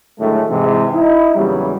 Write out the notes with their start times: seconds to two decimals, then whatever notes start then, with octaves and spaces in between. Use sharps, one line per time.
0.20 A2 D3 D#3 F#3 G#3 A3
0.49 G#2 C3 E3
0.94 D#4 E4
1.36 E2 A#2 C#3 F#3 G3